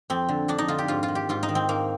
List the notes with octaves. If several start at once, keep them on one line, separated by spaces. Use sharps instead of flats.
F2 C4
D3
F2 D4
D#4
D3 F4
G4
G#2 F4
F4
D#3
G4
G#2 F4
D#4
D#3
C4
G#2 A#3